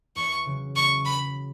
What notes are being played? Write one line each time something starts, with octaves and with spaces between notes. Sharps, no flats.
E2 C#6
C#3 F#3
E2 C#6
C#3 F#3 B5